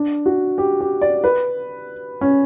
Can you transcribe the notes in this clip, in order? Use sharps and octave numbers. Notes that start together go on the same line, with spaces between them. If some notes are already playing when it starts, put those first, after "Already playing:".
Already playing: D4
F#4
G4
G4
D5
B4
C#4